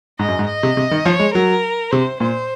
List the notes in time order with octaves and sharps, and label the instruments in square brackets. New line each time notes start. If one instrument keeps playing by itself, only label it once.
[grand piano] G#2 [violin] D#5
[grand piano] F#2
G#2
[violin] D#5
[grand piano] C3
C3
D#3
[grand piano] F3 [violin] C#5
[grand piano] G#3
[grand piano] F#3 [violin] A#4
[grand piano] C3 [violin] C5
[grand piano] A#2 [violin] C5